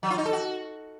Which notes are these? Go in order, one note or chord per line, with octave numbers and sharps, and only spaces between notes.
F#3
F4
D#4
A4
F#4